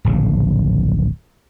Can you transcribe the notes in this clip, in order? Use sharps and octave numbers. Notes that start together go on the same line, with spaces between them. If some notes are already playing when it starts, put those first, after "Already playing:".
D1 A#1 C#3